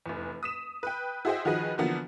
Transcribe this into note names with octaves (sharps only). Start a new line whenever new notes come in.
F1 E2
D#6 B6 E7
B4 G5
E4 F#4 G#4 C5 D#5 G5
D#3 F3 F#4 G#4 B4 D#5
D3 E3 F3 A#3 B3 F#4